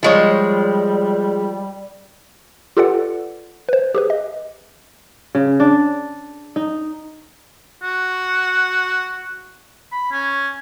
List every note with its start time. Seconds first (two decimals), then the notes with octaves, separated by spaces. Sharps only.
0.03 F3 G3 G#3 C#5
2.77 F4 G4 A4 B4 D5 F#5
3.69 B4 C5
3.95 G4 G#4 B4
4.10 D#5
5.35 C#3
5.60 D4
6.56 D#4
7.83 F#4
9.92 B5
10.12 C#4